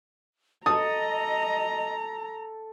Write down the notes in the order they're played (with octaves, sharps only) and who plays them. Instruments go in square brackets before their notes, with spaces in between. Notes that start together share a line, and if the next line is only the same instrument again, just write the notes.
[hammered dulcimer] A4 [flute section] D#5 [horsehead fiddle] A#5 [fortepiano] D#6